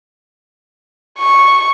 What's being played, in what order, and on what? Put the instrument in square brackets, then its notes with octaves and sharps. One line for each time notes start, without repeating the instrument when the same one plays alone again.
[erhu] C#6